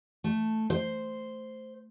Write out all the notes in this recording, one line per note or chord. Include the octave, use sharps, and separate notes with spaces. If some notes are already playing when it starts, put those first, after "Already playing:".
A3
C5